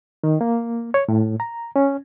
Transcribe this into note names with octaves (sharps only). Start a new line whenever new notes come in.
D#3
A#3
C#5
A2
A#5
C#4